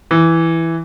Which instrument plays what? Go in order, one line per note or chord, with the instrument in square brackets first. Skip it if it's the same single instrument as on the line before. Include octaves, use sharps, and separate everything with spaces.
[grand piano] E3